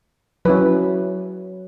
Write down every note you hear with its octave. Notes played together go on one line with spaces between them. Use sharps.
F#3 C#4 E4 B4